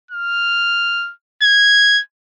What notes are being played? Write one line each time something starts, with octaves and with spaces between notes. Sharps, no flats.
F6
G#6